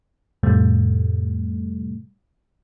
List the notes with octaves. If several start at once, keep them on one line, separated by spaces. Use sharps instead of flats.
F2 A2 C3 G3 A3